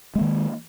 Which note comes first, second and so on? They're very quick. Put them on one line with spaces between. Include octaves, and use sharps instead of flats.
G#3 A#3 D#3